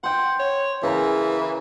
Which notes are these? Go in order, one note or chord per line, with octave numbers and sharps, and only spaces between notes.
C5 F#5 G5
C#5
C#3 E3 G#4 A#4 A#5